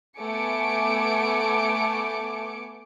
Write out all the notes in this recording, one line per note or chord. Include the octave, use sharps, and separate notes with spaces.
A3 B3 G#5 D6 C#7 D7